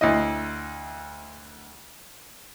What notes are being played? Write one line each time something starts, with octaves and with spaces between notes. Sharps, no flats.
D2 E4 D#5